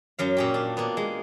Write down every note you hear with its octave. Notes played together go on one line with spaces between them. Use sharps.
F#2 F#3 F5
A#2 C#4 G4
D4
A#3 B3
G#3